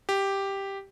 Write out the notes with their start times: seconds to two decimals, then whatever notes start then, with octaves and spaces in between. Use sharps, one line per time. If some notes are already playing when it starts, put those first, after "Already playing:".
0.09 G4